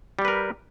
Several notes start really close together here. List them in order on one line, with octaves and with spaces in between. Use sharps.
G3 G4 B4 A#4